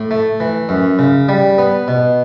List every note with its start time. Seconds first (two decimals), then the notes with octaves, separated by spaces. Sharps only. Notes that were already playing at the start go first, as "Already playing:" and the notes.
Already playing: A2
0.11 A3
0.40 E3
0.69 F#2
0.99 C#3
1.29 G3
1.58 B3
1.88 B2